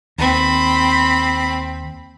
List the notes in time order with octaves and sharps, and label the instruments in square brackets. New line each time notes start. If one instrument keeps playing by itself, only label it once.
[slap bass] D#2 [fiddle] C4 B5